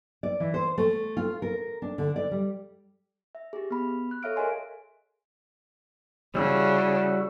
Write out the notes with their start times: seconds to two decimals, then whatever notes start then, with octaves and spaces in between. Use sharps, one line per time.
0.23 D5
0.40 E3
0.54 C5
0.78 A3
1.17 F4
1.42 A#4
1.82 D4
1.98 D3
2.16 D5
2.31 G3
3.35 E5
3.53 G4 G#4
3.70 B3 B5
4.11 F#6
4.23 A4 C#5 E5 F5 F6 D7
4.36 G#4 A#4 D#5 G#5 C6
6.35 C#3 G3 E4 F#4